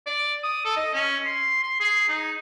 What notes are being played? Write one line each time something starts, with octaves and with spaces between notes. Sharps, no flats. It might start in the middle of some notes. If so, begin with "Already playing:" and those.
D5
D#6
A4
D#5
C#4
C6
C6
G#4
D#4